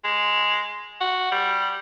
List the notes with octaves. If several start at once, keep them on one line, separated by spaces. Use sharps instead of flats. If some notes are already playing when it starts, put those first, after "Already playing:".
G#3
F#4
G3